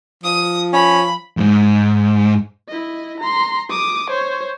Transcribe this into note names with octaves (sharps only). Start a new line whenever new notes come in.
F3 D#6
C#4 B5
D#2 G#2
E4 D#5
A#5 C6
D6 D#6
C5 C#5